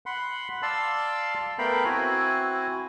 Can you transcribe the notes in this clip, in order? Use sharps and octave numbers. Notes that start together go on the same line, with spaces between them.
F#5 B5 C6
D5 F5 A5 C6 E6
A3 B3 A#4 F5 G5 B5
C4 E4 F#4 G#5